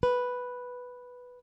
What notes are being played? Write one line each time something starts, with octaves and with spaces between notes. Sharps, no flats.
B4